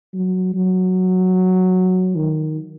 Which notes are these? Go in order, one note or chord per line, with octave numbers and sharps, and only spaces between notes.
F#3
F#3
D#3